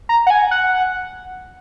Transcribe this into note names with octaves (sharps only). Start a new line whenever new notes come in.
A#5
F#5
G#5
F#5